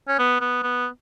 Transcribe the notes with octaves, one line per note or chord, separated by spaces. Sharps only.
C#4
B3
B3
B3